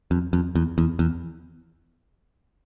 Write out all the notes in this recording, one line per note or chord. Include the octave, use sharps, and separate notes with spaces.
F2
F2
E2
E2
E2